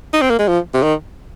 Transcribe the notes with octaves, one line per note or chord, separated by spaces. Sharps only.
D#4
C4
A#3
G#3
F3
C3
D#3